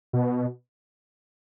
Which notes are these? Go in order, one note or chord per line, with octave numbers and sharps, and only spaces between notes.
B2